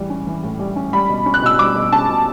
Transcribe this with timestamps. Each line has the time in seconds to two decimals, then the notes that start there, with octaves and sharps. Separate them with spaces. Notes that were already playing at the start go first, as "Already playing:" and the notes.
Already playing: A2 E3 G3
0.10 C#4
0.27 E3
0.43 A2
0.59 G3
0.76 C#4
0.93 G3 B5
1.09 B2
1.26 C#4
1.34 F#6
1.42 B2 E6
1.59 G3 D6
1.76 B2
1.92 C#4 A5
2.09 B2